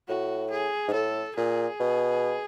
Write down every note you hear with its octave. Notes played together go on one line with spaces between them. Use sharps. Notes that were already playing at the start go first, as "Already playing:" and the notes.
A2 F#4
G#4
G#2
A2 A4
A#2 G#4
B2